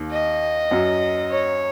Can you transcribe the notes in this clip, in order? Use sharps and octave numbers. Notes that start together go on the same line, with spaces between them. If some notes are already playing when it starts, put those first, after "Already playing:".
Already playing: D#2 D#3
D#5
F#2 F#3
C#5